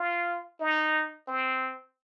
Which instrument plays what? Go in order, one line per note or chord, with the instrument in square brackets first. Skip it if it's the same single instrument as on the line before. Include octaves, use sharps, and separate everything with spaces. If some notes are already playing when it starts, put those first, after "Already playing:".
Already playing: [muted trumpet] F4
D#4
C4